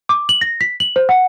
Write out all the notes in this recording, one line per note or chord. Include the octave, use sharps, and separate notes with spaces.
D6
F#7
A#6
B6
F#7
C5
F#5